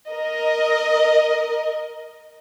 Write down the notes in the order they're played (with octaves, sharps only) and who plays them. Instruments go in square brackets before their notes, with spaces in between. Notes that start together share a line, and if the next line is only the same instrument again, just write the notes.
[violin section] A#4 D#5